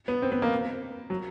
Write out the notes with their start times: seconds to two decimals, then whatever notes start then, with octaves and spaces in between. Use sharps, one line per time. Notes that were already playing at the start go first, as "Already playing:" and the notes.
0.08 B3
0.22 C4
0.32 B3
0.42 A#3
1.10 F#3